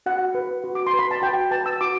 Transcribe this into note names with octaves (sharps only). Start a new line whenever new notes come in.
F#4 F#5
B4
F#4
D6
C6
B4
B5
A5
F#4 G5
B4 A5
E6
F#4 D6